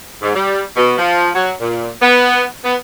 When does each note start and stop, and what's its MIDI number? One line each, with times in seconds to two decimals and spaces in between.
0.22 0.32 44
0.36 0.63 55
0.76 0.94 47
0.98 1.29 53
1.35 1.52 54
1.61 1.89 46
2.02 2.43 59
2.64 2.76 59